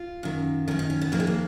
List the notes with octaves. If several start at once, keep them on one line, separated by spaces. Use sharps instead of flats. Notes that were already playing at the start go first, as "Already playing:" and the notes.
Already playing: F4
F#2 D#3
F#2 D#3 C#4
D#4
C#4
B3
F2 D#3 A#3
G#3
A#3